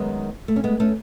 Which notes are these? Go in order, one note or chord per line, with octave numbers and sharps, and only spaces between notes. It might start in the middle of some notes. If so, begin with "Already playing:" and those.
Already playing: F#2 D#3 G#3 B3
A3
C#4
G#3 B3
A3 C#4